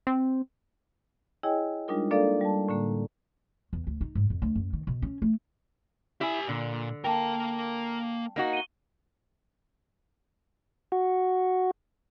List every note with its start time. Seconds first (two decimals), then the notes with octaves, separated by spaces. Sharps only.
0.07 C4
1.43 E4 G#4 C#5 D#5 G5 G#5
1.88 G3 G#3 D4 D#4 F4 A#4
2.11 A#3 D4 A4 A#4 D5 F5
2.41 G3 A5
2.69 A2 D3 A#3
3.73 E2
3.87 D2
4.01 D#4
4.15 G#2
4.30 F2
4.42 D2
4.55 F#2
4.73 D#3
4.87 B2
5.02 C#4
5.22 A3
6.21 E4 G4 G#5
6.49 A#2 D3
7.04 A#3 A#4 G5 A5
8.36 A#3 D#4 F#4
8.53 D#7 G7
10.92 F#4